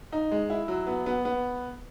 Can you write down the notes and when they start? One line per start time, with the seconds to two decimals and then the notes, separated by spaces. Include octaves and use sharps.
0.12 D#4
0.32 G#3
0.50 E4
0.68 F#3
0.87 B3
1.06 B3
1.25 B3